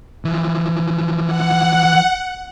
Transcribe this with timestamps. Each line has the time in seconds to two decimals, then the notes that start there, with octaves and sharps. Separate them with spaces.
0.25 E3 F3
1.26 F#5